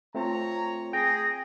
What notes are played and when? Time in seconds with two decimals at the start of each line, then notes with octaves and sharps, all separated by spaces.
0.15 A3 C4 F4 C#5 A#5
0.93 G#4 G5 A#6